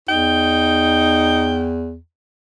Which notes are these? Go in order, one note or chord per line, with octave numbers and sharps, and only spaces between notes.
E2 D#4 G5